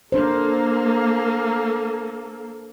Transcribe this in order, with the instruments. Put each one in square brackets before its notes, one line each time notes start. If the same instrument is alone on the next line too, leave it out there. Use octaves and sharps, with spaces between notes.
[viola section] A#3 A4 [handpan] D4 C5